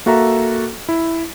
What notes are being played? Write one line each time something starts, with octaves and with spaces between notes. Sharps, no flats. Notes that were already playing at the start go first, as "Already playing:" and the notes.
A#3 F#4 A4 E5 A#5
E4